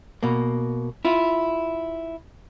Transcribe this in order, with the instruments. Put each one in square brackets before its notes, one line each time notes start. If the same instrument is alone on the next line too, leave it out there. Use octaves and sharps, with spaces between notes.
[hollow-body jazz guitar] B2 A#3
E4 F4